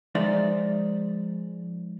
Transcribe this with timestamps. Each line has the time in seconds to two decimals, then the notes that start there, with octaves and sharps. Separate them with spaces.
0.15 F3 G#3 D#4 C5 D5 E5